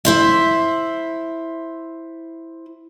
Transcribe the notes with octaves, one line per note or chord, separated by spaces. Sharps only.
E4 C5 E5